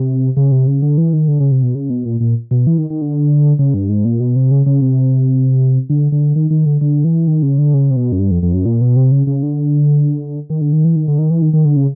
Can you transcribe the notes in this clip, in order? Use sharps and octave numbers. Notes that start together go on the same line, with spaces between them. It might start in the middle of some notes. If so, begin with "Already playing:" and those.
Already playing: C3
C#3
C3
C#3
D3
E3
D#3
D3
C#3
C3
B2
C#3
B2
A#2
A#2
B2
E3
D#3
D#3
D3
C#3
G2
G#2
A#2
B2
C3
C#3
C#3
C3
D3
D3
D#3
D#3
D3
D3
E3
D#3
C#3
D3
C#3
C3
B2
F#2
G2
F2
F2
F#2
A#2
B2
C3
C#3
C#3
D3
D#3
D3
D#3
E3
D#3
D3
D#3
E3
D#3
D#3
D3
C#3